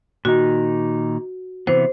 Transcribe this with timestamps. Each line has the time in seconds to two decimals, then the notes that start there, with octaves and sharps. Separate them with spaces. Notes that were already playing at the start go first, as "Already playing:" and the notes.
0.25 A#2 D#3 D#4 F#4
1.67 C3 E3 B3 C5